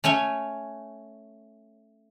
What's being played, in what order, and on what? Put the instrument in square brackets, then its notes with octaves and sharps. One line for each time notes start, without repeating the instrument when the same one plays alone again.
[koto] A3 C#4 C#5 G#5